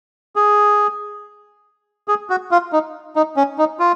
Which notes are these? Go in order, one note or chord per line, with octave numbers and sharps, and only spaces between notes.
G#4
G#4
F#4
F4
D#4
D#4
C#4
D#4
F4